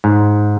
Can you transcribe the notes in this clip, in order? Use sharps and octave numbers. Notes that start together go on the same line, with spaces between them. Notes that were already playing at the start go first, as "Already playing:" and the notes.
G#2